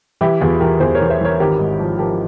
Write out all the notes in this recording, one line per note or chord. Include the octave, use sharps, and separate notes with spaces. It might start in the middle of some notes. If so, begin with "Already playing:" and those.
E3 E4 G4
E2 F4 G#4
E3 G4 A#4
E2 G#4 C5
A#4 C#5
E3
C5 E5
E3 A#4 C#5
G#1 G4 A#4
G#2
F3
F3 G4 A#4